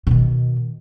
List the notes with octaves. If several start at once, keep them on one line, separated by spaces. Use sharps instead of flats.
B2 D#3